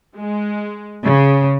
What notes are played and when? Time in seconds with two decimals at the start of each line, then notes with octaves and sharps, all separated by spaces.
0.18 G#3
1.05 C#3